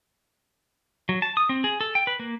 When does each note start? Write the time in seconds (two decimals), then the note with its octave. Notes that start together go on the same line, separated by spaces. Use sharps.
1.09 F#3
1.22 A5
1.37 D#6
1.49 C4
1.64 G#4
1.81 A4
1.95 G5
2.07 B4
2.20 A#3